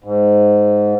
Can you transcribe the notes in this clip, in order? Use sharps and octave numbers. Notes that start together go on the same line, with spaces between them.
G#2